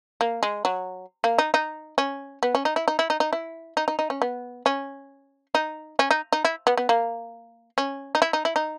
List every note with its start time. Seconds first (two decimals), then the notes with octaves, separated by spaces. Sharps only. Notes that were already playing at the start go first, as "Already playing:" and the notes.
0.21 A#3
0.43 G#3
0.65 F#3
1.24 A#3
1.38 D#4
1.54 D#4
1.98 C#4
2.43 B3
2.55 C#4
2.65 D#4
2.76 E4
2.88 D#4
2.99 E4
3.10 D#4
3.20 D#4
3.33 E4
3.77 D#4
3.88 D#4
3.99 D#4
4.10 C#4
4.22 B3
4.66 C#4
5.55 D#4
5.99 C#4
6.11 D#4
6.33 D#4
6.45 E4
6.67 B3
6.78 B3
6.89 A#3
7.78 C#4
8.15 D#4
8.22 E4
8.33 D#4
8.45 E4
8.56 D#4